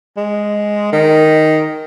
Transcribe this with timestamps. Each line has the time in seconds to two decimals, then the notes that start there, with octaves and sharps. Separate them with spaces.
0.17 G#3
0.92 D#3